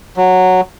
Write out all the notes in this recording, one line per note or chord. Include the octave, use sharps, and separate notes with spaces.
F#3